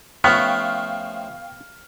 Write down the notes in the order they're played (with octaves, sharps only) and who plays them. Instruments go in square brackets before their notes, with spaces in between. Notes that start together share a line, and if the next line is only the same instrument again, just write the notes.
[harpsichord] F3 A3 C#4 [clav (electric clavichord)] B3 [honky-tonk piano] F5 G5 C#6 [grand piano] F6